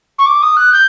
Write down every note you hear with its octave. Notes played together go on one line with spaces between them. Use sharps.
C#6
D6
D#6
F#6
G6